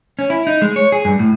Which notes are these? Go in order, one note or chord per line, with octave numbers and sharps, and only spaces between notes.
C#4
E4
D#4
G#3
C#5
G#4
G2
A2